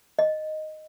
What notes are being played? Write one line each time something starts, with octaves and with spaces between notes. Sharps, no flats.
D#5